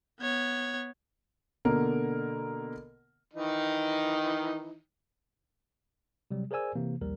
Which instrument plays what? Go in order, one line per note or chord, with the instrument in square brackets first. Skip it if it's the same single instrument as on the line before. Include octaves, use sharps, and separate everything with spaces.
[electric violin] B3 C#5
[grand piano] B2 D3 A#3 A#4
[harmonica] D#3 E3 D#4
[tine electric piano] C3 F#3 G3
G#4 A#4 C5 D5 G#5 E6
C3 E3 A#3
A#1 D#2 G3 A#4